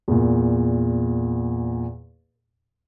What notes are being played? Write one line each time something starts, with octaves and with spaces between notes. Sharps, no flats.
E2 A#2